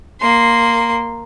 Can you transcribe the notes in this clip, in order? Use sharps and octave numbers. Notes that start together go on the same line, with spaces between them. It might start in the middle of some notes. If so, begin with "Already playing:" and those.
A#3 C6